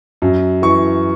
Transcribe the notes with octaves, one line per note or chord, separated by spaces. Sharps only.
F#2
E3 C#6